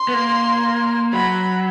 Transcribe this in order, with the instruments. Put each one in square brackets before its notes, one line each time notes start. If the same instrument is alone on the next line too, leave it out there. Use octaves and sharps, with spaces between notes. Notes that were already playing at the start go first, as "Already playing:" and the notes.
Already playing: [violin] C6
[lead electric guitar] B3
A#3
[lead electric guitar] F#3 [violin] B5